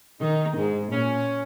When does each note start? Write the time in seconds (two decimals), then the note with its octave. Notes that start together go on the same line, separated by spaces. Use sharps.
0.19 D#3 D#4
0.57 G#2
0.92 A#2 C#4